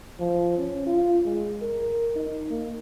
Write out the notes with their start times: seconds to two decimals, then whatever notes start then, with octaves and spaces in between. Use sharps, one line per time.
0.20 F3
0.58 C#4
0.87 F4
1.25 G#3
1.62 A#4
2.16 D#4
2.50 A#3